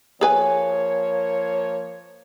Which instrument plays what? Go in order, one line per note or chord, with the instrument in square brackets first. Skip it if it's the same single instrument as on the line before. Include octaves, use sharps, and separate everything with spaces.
[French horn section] F3 A#3 C#5 [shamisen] G#4 B4 G#5